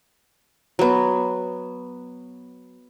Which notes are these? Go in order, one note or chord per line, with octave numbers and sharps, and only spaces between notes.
F#3 B3